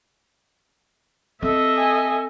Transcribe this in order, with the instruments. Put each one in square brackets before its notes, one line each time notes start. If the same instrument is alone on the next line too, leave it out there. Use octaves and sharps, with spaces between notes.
[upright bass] C4 [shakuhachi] A4 [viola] D#5 E5
[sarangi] G#5